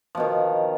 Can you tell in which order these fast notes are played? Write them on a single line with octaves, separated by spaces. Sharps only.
F3 B2 D#3